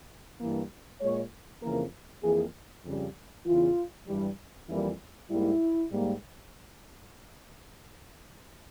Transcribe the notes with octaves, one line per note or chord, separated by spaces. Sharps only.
G2 E3 A#3
A#2 G#3 C#5
F2 C#3 E3 A#3 A#4
F2 E3 A#3 G#4
F2 C#3 G3
E2 C#3 E3 F4
G2 E3 G3
F2 E3 G3 A#3 E4
G#2 G3 A#3 E4
G#2 G3 A#3